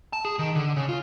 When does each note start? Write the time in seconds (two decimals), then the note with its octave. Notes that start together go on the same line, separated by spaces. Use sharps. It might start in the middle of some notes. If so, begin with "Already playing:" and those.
0.13 A5
0.25 G#4
0.39 D#3
0.55 D3
0.76 C#3
0.89 F4